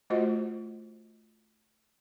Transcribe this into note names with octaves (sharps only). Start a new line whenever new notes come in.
A3 F4 F#4 C5 D#5